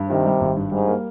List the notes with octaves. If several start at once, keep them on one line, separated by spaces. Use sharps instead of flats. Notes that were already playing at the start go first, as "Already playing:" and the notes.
Already playing: G2
C3 D#3
G3
G#1
G2
G#2 G3
A#3